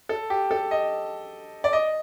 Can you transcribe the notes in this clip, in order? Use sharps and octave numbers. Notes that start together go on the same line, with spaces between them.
A4
G4
A4
D#5
D5
D#5